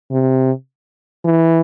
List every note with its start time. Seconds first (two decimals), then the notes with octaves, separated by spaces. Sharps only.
0.12 C3
1.25 E3